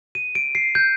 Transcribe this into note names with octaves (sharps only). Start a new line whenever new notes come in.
D#7
D7
C7
G6